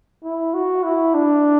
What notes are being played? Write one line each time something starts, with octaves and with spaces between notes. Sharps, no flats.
E4
F#4
E4
D4